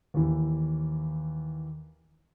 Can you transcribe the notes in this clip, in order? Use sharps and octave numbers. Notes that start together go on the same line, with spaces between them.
D#2 E3